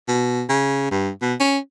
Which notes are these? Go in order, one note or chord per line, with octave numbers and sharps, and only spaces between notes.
B2
C#3
G2
B2
C#4